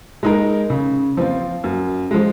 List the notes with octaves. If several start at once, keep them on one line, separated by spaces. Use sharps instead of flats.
G#3 D#4 A#4
C#3
F3 C4 F4
F#2
F3 G#3